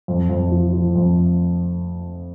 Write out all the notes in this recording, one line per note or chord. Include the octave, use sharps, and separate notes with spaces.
F2
F2
F3
F3
F2